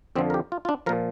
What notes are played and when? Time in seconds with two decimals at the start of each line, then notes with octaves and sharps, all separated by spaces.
0.16 F2 D3 F3 C4
0.30 A#4
0.34 G4
0.52 F4
0.65 F4
0.69 D4
0.86 A#2 F3 A#4